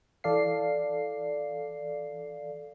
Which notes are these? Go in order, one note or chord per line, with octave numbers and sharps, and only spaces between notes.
E3 A4 D5 F5 C7